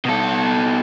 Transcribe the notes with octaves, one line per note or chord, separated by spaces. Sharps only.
B2 A4